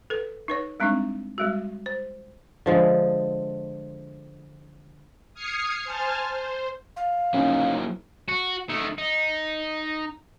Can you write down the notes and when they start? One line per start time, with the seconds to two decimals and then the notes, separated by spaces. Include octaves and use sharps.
0.10 A4 B4
0.48 D#4 B4 C#5
0.80 G3 G#3 C4 D4 D#4
1.38 G3 G#3 F#4
1.86 C5
2.66 D3 F3 G#3
5.34 D#6 F6 G#6 C7 C#7
5.84 C5 G#5 A5 F6
6.33 C5
6.96 F5
7.34 F#3 A#3 C#4 D#4 E4
8.29 F#4
8.70 D#3 A3
8.98 D#4